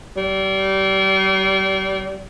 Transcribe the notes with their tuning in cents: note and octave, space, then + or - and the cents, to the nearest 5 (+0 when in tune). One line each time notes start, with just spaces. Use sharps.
G3 -30